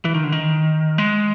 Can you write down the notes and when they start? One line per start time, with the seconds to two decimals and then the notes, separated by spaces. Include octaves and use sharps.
0.05 E3
0.15 D#3
0.24 D3
0.32 D#3
0.98 G#3